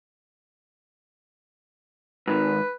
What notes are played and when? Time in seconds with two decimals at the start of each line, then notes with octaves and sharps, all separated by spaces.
2.28 G#2 D#3 B4